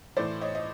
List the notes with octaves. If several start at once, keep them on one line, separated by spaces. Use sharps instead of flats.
A2 E3 A3 C5 D5
C#5 D#5
D#5